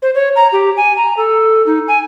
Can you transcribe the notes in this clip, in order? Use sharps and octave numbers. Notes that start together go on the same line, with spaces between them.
C5
C#5
A#5
G4
G#5
A#5
A4
D#4
G#5